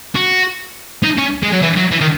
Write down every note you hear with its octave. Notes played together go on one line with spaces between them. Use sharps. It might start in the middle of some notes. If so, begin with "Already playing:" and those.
F#4
D#4
C#4
G#3
F#3
E3
F#3
E3
D#3